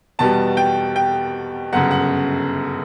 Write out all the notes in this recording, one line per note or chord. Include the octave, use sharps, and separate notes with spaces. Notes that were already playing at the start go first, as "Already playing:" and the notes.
E2 B2 G3 B3 A5
G5
G5
G1 F#2 C#3 F#5
F#5